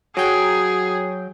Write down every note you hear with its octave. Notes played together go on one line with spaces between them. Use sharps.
F#3 G#4 G5